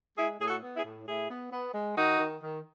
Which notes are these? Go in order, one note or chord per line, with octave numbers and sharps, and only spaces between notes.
G#3 E4 G#4
A2 G#4
F#4 A4
B3
E4 G#4
A2
A2 E4 G#4
B3
B3
G#3
D#3 D#4 F#4
D#3
D#3